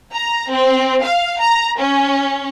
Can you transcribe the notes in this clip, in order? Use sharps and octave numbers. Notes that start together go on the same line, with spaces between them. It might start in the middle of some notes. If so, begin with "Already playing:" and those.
A#5
C4
F5
A#5
C#4